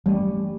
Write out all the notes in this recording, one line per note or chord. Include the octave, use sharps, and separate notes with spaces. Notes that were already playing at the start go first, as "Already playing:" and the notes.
E3 G3 A3 C#4